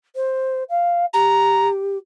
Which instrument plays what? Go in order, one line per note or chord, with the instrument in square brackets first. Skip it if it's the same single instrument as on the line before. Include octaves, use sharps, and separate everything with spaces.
[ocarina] C5
F5
[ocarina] G4 [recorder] A#5